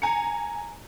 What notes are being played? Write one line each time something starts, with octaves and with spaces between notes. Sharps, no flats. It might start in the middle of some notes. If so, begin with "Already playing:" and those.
G#5 A#5 C#7